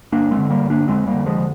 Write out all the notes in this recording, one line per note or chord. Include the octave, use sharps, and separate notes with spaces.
G1 A#3 D4
G#3 C4
D3
G3 A#3
G1
A#3 D4
F2 G#3 C4
G3 A#3
D3
F3 G#3
D3